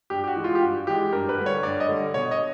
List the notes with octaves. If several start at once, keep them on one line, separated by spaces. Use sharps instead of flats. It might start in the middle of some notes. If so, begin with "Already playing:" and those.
G2 G4
G4
F#4
E3 G#3
F4
G4
G2 F#4
E3 G#3 G4
G2 A#4
B4
D3 G3
C#5
G2 D5
D#5
D3 G3
B2 C#5
D#5